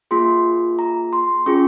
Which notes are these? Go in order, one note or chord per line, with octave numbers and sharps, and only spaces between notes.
A#3 F4 G#4 C6
A#5
C6
C#4 F4 G#4 C#6